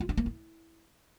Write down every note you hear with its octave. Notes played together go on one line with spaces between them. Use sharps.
F4
D4
A#3
E4